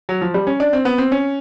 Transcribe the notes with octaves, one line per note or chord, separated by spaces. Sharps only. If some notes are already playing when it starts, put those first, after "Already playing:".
F#3
F3
G3
C#4
D4
C4
B3
C4
C#4